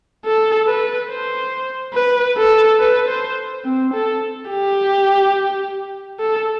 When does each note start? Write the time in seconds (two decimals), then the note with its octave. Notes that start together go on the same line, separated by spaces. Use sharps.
0.25 A4
0.67 B4
1.09 C5
1.94 B4
2.37 A4
2.80 B4
3.08 C5
3.65 C4
3.94 A4
4.50 G4
6.20 A4